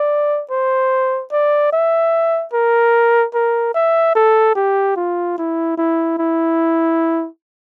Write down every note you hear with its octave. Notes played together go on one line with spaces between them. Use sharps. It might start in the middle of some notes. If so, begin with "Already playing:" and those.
Already playing: D5
C5
D5
E5
A#4
A#4
E5
A4
G4
F4
E4
E4
E4